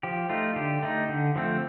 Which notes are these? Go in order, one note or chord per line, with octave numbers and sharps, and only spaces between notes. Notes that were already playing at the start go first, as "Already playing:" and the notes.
F3 G4
A3 D#4 F4
D3 G4
A3 D#4
D3
F3 A3 C4